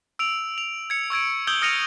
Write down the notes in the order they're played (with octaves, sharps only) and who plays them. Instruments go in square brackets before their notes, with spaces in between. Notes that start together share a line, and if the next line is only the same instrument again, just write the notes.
[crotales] E6 D7 F7
F7
G#6 C#7
C#6 E6 G#6 D7
D#6 E6 G6 G#6 F#7 G7
D#6 F6 A#6 C#7 D#7 F7